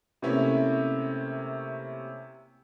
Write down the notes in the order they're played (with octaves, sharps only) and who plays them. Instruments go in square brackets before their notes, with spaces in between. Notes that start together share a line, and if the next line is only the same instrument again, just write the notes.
[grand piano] C3 A3 A#3 C#4 E4